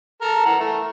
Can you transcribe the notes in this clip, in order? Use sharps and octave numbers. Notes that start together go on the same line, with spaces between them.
A4 A#4
E3 F#5 A#5
A3